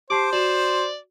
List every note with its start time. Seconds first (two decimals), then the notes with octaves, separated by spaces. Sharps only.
0.10 G4 C5 A5 D6 C7
0.33 F#4 D5 E7